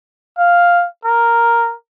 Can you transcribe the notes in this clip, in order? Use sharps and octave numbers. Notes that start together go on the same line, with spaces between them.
F5
A#4